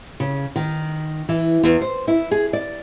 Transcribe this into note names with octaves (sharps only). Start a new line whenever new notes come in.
C#3
D#3
E3
E2
C5
E4
G#4
D5